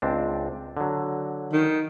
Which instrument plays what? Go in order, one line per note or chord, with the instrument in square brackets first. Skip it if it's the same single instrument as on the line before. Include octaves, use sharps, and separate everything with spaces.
[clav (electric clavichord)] C#2 C4 D4
D3 F#3
[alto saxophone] D#3